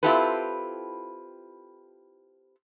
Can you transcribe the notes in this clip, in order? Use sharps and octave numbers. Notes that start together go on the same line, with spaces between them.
C4 E4 F4 G4 A4 B4